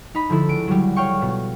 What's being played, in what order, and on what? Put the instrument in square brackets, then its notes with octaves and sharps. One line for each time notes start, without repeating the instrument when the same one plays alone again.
[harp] D#4 B5
D3 F3 E4 A4
C#2 D7
F#3 G3
C#5 F5 G5 C#6
B2